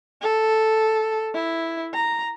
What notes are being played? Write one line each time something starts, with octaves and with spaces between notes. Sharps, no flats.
A4
E4
A#5